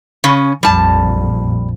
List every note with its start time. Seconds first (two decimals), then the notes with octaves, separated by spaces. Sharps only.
0.24 C#3 C#4
0.63 A#1 F2 A#2 G3 A5